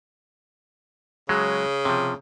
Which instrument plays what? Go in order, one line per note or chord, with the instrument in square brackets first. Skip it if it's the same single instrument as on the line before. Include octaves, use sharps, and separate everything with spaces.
[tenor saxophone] C#3 [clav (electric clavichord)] F#3 G#3
[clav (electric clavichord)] C3 F3